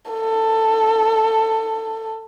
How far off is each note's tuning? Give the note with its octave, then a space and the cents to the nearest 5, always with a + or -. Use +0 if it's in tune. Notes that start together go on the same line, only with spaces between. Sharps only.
A4 +15